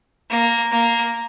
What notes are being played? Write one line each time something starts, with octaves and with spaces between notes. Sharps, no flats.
A#3
A#3